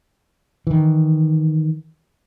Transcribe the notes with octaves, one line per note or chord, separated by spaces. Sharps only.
D#3 E3